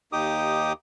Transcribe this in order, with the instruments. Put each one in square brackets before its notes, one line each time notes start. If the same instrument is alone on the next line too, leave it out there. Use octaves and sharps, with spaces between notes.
[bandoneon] D#2 D#4 G4 D6 D#6